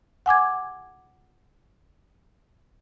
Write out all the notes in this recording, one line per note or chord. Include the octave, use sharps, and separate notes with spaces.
F#5 G#5 D6 G#6